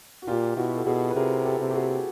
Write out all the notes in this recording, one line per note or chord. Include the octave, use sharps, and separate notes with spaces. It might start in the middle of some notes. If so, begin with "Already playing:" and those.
F#4
A#2 F4 G4
B2 E4 F#4
A4
B2 F#4 G#4
B4
C3 G#4 A#4
G4 A4
C3
G4
F#4 G#4